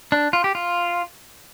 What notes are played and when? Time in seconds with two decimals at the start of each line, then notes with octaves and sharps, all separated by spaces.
0.12 D4
0.33 F4
0.44 G4
0.55 F4